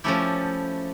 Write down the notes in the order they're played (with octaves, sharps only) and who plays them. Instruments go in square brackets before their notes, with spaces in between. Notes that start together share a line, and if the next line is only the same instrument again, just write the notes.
[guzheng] F3 A3 C#4 E4 G4